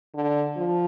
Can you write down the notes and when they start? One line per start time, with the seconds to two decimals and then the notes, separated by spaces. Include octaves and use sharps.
0.14 D3
0.57 F3